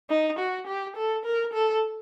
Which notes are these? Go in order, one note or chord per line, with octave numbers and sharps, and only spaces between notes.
D#4
F#4
G4
A4
A#4
A4